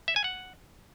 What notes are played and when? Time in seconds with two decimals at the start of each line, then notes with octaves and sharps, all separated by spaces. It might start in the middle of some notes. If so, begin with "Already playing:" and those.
0.08 E5
0.16 G#5
0.24 F#5